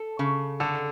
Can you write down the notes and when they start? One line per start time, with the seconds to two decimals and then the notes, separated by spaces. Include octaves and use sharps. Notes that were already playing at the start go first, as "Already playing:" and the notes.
Already playing: A4
0.19 C#3
0.60 D3 A4